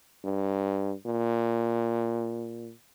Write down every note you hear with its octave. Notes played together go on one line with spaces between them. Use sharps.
G2
A#2